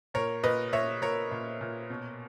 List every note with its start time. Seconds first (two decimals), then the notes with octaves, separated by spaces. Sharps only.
0.14 A#2 A#4 C#5
0.44 A#2 B4 D#5
0.73 A#2 C#5 E5
1.02 A#2 A#4 C#5
1.31 A#2
1.61 A#2
1.90 B2